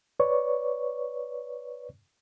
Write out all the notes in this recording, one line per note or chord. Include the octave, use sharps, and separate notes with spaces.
B4 C#5 D5 C#6